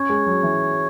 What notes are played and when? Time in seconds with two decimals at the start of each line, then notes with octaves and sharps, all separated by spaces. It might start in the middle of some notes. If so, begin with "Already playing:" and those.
Already playing: C#4 C#5
0.09 G#3
0.26 F#3
0.43 E3